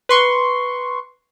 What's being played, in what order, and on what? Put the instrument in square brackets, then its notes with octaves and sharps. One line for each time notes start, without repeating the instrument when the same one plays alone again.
[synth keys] B4 C6 C#6